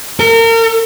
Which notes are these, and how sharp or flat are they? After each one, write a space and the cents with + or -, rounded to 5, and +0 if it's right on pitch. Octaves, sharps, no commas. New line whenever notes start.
A#4 -35